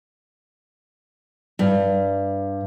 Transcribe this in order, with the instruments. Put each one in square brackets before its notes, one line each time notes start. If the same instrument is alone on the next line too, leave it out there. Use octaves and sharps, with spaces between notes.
[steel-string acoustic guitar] G2